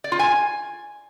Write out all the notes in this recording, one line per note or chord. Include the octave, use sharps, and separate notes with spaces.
D5
F4
G#5